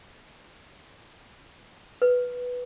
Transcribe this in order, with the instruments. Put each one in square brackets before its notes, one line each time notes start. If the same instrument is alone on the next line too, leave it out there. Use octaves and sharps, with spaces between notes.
[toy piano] B4